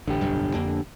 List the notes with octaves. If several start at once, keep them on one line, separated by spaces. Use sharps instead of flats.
A1 D3 G4
F1 B1 G2
F2 A#3 D4